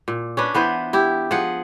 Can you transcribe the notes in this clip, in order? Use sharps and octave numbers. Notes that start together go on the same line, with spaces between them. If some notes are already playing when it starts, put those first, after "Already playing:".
A#2
C#4 D4 B4
E3 B3 B4 C5
E4 G4
F3 G#4 F#5